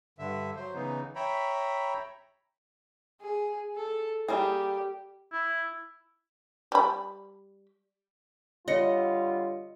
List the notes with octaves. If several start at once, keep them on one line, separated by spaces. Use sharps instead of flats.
G2 D3 E5
F#3 C5
C#3 E3 B3 D#4
C#5 E5 G5 A#5 B5
G#4
A4
G3 A#3 G4 G#4
E4
G3 B5
D3 G3 F4 C#5 D#5 A#6 C#7